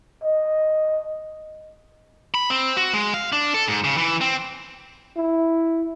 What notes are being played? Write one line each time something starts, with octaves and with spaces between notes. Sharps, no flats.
D#5
B5
C4
F#4
G#3
F5
D4
A4
G#2
C#3
E3
C4
E4